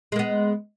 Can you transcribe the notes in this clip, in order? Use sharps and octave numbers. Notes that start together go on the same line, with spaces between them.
G#3 A#3 B3